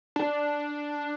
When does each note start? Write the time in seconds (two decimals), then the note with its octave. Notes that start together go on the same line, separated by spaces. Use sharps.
0.16 D4